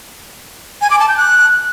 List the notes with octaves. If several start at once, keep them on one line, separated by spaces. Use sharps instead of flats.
G#5
D6
A5
G6
F#6